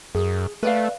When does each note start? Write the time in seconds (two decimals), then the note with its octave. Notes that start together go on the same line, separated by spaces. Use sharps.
0.15 F#2 G#4
0.63 A3 B4 D5 F5